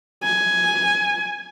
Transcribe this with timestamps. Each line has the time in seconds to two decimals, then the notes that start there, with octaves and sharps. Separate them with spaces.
0.24 G#5